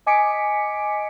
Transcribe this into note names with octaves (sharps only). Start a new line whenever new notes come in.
D#5 G#5 D6 B6 C#7 D7